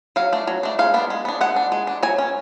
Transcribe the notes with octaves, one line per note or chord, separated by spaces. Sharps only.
F#3 F5
A3 D4
F#3
A3 D4
G#3 F5
B3 D4
G#3
B3 D4
G#3 F#5
D4
G#3
D4
F#3 G#5
C#4